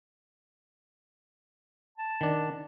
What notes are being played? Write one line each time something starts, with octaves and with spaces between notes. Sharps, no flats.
A5
D#3 D4